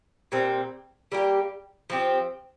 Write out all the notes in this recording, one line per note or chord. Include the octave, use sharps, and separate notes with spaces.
A#2 G3 C4
G3 A#3 G4
F3 C4 G4